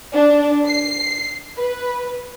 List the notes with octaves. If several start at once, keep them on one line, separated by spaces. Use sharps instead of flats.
D4
C7
B4